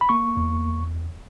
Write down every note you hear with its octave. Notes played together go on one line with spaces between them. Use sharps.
B5
A#3 C#6
E2